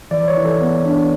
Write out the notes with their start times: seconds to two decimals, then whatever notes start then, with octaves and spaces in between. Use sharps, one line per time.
0.11 E3 D5
0.28 C#5
0.37 E3
0.45 A4
0.61 B3
0.85 D4